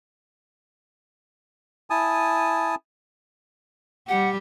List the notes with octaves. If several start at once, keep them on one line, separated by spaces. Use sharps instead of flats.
E4 G#5 A5 D#6
G3 G4 F#5